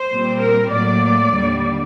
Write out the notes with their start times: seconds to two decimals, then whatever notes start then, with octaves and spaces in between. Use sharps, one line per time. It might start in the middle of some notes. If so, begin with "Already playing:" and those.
Already playing: C5
0.09 A#2 G3 C4
0.40 A#4
0.71 A2 F#3 A#3 D5
1.34 D#2 D3 G3